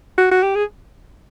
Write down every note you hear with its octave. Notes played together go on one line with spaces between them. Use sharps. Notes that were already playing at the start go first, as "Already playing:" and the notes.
F#4
F#4
G4
G#4